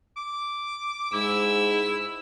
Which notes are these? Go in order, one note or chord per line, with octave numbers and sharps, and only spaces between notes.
D6
G#2 E4 E6